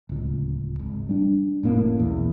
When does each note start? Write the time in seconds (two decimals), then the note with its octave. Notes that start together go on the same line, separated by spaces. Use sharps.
0.09 D1 C#2
0.79 G#1
1.09 G3 D4
1.63 F1 A2 A#3 C#4
1.97 B1 E2 A#2